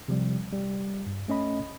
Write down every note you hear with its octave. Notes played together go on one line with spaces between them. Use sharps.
C3 F3 G3
G3
G2
A3 C#4 D#5 B5